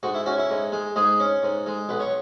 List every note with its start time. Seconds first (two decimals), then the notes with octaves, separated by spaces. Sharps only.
0.03 G#2 F#4
0.14 E4
0.26 C#4 F#4
0.38 E4
0.50 G#2
0.72 G#3
0.96 G#2 G#3 G#4
1.20 C#4
1.43 G#2
1.66 G#3
1.89 B1 B4
2.00 C#5